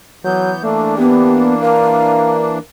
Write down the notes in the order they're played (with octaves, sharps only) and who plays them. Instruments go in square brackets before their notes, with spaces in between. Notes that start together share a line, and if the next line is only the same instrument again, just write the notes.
[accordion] E3 B3 G6 [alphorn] F#3
[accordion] E3 A#3 D4 [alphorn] A3
[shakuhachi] B3 [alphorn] G4
[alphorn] A#4 [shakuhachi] F5